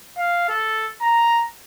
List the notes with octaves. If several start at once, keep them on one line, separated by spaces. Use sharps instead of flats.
F5
A4
A#5